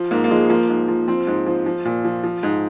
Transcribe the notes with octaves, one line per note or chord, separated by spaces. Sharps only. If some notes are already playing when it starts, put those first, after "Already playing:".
Already playing: F3
G#2 A#3
A#3
F3 G#3
F3 A#3
G#2
F3
F3 C4
G#2
F3
F3
A#2
F3
F3
G#2